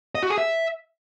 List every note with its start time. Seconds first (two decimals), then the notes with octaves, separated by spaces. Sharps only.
0.15 D#5
0.23 F#4
0.30 G#4
0.38 E5